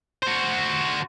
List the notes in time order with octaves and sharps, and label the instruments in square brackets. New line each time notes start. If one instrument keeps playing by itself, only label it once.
[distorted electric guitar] F#4 C5